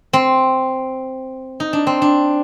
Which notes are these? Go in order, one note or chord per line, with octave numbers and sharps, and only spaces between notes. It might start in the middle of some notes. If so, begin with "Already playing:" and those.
C4
D#4
D4
C4
D4